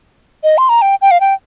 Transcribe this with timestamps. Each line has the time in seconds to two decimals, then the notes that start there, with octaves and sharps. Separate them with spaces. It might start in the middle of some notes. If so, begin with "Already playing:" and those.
0.43 D#5
0.58 C6
0.69 A#5
0.82 G5
1.02 G5
1.11 F5
1.21 G5